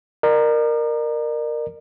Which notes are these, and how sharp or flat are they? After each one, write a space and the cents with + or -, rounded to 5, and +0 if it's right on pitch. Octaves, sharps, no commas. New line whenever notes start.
A#4 +0 D5 +45